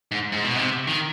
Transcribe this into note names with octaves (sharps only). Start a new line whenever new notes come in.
G#2
G#2
B2
C3
D#3